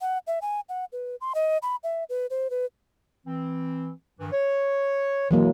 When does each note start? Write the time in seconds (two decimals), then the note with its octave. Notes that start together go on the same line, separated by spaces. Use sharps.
0.01 F#5
0.27 E5
0.42 G#5
0.69 F#5
0.92 B4
1.21 C6
1.35 D#5
1.62 B5
1.84 E5
2.09 B4
2.30 C5
2.50 B4
3.26 E3 C4
4.19 G2 D#3 E3
4.32 C#5
5.31 B2 E3 F#3 G#3 A#3